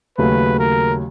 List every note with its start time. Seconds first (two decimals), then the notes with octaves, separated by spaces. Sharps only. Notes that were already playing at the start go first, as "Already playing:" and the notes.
0.18 D#2 C#3 F#3 A3 B4
0.59 A#4